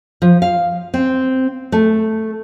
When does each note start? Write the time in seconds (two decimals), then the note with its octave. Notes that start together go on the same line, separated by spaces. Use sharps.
0.22 F3
0.42 F5
0.94 C4
1.72 A3